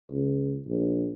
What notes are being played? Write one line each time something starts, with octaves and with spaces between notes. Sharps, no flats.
C#2
A#1